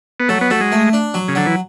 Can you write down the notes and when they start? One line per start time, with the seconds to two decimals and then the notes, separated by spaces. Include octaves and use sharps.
0.20 B3
0.29 F#3 A3
0.41 B3
0.50 F#3 A3
0.61 G#3
0.72 A3
0.93 D4
1.14 F#3
1.28 C#3
1.35 D3 F#3
1.46 E3